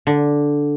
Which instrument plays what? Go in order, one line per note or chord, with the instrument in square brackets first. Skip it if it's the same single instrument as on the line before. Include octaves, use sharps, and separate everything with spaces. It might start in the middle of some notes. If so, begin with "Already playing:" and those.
[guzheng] D3